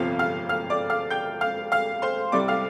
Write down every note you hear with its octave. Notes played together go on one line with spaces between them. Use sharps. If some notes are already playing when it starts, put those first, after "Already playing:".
Already playing: G1 F2 C3 F3 F5
F5 F6
F5 F6
D5 D6
F5 F6
G5 G6
F5 F6
F5 F6
C5 C6
C2 C3 G3 D5 D6
F5 F6